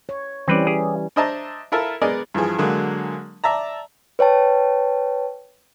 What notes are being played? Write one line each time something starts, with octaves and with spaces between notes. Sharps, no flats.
C#5
E3 G3 C4 C#4 B4 D5
G4 G#4
D4 C5 D#5 E5 A5 A#5
E4 F4 A4 A#4 E5 A5
G#3 B3 G#4 A#4 D5 D#5
G2 E3 F3 G#4
D3 F#3 G#3 A#3
D5 E5 A5 A#5
B4 C#5 G5 A5